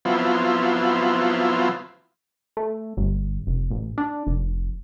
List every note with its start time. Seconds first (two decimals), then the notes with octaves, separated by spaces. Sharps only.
0.05 F3 F#3 B3 C4 E4 F4
2.57 A3
2.97 G1
3.47 F1
3.71 A1
3.98 D4
4.27 F1